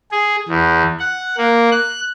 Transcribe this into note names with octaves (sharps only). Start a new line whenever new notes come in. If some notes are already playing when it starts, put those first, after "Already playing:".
G#4
E2
F#5
A#3
F#6